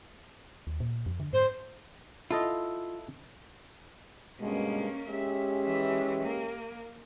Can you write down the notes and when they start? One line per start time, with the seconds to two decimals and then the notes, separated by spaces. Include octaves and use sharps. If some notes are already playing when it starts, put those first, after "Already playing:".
0.67 D#2
0.80 A#2
1.06 F2
1.20 D3
1.33 G#2 C5
2.31 E4 F4 A4 D#5
4.40 G2 B2 G#3 A#3 C#4
5.08 G#3 C#4 G4 E5
5.63 E3 E5
6.22 A#3